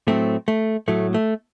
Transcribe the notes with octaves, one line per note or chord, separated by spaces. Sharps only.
A2 F#3 A3 C4
A3
A2 F#3 A3
A3